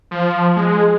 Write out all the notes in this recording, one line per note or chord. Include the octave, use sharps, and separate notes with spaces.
F3
G#3